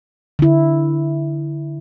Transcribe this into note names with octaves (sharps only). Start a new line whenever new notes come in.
D3 E4